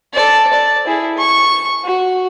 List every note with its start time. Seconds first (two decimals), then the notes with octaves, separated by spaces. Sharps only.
0.13 A4 D5
0.53 D5
0.86 E4 G#4
1.17 C#6
1.84 F#4